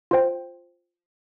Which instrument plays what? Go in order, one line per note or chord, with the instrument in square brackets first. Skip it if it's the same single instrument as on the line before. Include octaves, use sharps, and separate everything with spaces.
[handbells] F4 C5 G5